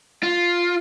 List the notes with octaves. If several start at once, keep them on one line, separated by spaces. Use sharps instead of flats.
F4